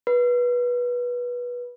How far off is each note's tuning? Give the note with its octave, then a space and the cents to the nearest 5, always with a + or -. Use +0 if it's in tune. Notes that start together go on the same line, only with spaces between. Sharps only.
B4 -20